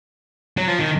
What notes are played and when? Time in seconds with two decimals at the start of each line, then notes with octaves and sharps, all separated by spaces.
0.57 F#3
0.68 F3
0.79 D#3